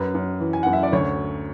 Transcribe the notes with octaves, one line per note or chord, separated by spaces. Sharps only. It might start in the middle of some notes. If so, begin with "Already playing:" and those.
Already playing: F#2 B4
F#2
E3
G#5
F#2 F#5
E5
D5
D2 C#5